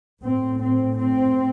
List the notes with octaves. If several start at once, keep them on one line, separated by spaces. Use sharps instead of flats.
A2 C4
C4
C4